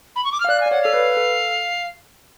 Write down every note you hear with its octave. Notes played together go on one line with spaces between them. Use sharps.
B5
C#6
D6
F6
F5
D5 F#6
G#5
D5
C#5 F#5
A4 F5
B4
A4